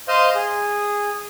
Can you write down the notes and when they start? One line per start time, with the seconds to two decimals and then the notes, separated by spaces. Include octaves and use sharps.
0.08 C5 D#5 F5 C6
0.35 G#4